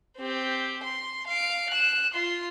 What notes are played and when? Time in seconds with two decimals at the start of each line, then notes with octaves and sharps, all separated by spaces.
0.17 C4 G4
0.84 C6
1.27 F5 D7
1.70 F#6 E7
2.14 F4 C6